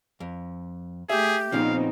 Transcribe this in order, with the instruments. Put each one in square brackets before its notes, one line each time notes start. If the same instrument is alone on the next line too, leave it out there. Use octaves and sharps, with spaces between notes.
[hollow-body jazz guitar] F2
[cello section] A3 [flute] G4 [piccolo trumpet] G#4 [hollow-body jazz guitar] E5
[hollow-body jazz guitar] A#2 C#3 F3 [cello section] B3 C4 D#4 [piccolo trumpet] F5